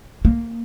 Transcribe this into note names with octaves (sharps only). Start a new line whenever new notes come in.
A#3